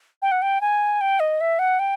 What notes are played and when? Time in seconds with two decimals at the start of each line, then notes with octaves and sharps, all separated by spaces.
0.22 G5
0.31 F#5
0.42 G5
0.61 G#5
1.01 G5
1.20 D#5
1.41 E5
1.59 F#5
1.79 G5